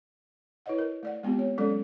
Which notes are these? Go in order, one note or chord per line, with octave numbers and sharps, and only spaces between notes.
E4 B4 C#5 D#5 F#5
A#4
A3 D5 F#5
G#3 B3 C4 F4 G4
C#5
F#3 G#3 C#4 A4 D5